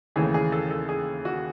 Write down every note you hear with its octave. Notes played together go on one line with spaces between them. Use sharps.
D#2 C#3 E3 A3 G#4
G#4
A4
A4
G#4
F#4